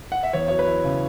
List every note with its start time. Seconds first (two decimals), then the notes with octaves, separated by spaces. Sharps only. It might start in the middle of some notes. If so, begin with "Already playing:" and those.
0.12 F#5
0.23 E5
0.33 E2 C#5
0.48 F#3 C#5
0.59 B4
0.67 E4
0.84 C#3